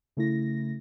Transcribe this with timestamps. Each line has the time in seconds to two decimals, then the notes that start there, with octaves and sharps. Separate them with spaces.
0.17 C#3 A3 E4 A#6